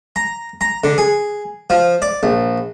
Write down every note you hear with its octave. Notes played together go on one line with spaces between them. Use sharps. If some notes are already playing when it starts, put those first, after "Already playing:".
A#5
A#5
D3
G#4
F3
D5
A#1